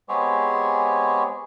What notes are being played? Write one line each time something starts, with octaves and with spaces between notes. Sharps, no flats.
G#3 B3 C4 G4 G#4 C#5